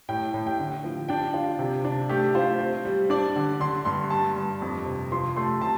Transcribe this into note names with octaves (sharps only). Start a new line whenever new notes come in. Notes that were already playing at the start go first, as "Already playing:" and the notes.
A2 G5
A2
G5
D3
F3
D4 G5
F4
C3
D4
A3 G4
F4 C5
C4
G3
D4 D5
D3
D3 C6
G2 C6
G3 A5
G2
F2
C3
F3 C6
A3 C6
C3 A5